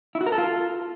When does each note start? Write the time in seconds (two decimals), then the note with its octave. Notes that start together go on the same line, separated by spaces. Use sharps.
0.15 E4
0.21 F#4
0.26 A#4
0.32 A4
0.38 F4